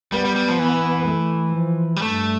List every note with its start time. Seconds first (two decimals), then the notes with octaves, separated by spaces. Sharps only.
0.12 G3 B3
0.25 G3
0.36 G3
0.48 F3
0.59 E3
1.07 A3
1.55 F3
1.96 G3
2.02 G2 A3